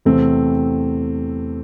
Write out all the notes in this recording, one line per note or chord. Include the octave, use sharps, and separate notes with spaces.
E2 C3 E3 A3 C4